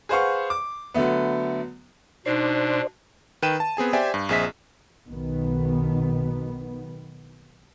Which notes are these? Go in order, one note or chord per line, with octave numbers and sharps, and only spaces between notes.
G#4 B4 C5 F5 F#5 C#6
D6
D3 F#3 A3 B3
B2 D4 D#4 C5 D5 C6
D#3 B4 G5 D#7 E7
A5
B3 C4 G#4 G#5
G4 C5 D5 E5 G5 G#5
G2
A#1 C4 G#4 D#5 E5 B6
B1 B2 D#3 B3